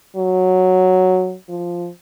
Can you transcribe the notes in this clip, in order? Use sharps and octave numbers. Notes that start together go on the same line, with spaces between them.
F#3
F3